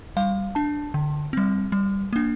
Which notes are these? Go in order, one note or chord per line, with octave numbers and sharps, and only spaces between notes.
G3 F5
D4 A5
D3
G3 C4
G3
A#3 D4